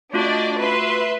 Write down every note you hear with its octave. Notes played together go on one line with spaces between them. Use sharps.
A3 D4 F4 F#4 D5 D#5
B4 E5 C6